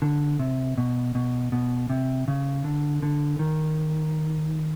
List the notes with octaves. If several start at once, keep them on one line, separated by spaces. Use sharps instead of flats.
D3
C3
B2
B2
B2
C3
C#3
D3
D3
D#3